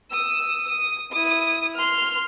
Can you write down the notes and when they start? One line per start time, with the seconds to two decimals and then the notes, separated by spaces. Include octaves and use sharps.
0.11 D#6 E6
0.68 D#6
1.12 E4 D#6
1.76 C6 F6